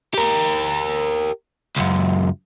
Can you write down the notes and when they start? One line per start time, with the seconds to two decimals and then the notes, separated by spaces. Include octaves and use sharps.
0.14 G4 A#4
1.77 C#2 F#2